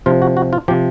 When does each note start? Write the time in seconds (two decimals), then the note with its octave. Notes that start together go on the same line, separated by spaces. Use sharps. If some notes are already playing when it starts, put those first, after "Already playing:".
0.06 C3 F3 F4
0.22 F#4
0.37 F#4
0.53 F4
0.68 C3 F3 G4